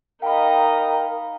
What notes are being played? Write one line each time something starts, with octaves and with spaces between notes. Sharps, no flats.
D#4 A#4 D#5 F5 G5 B5